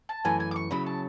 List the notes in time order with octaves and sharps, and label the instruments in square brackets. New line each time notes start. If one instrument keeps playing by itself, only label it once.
[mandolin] A5
[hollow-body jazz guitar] F#2 E3 A3 [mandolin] G#5
[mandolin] G#5
D6
C#6
[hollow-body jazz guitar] C#3 F#3 C#4 E4 [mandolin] B5
[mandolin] A5